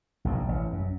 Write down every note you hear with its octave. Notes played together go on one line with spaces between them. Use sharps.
A#1 G2 B2
A1
F#2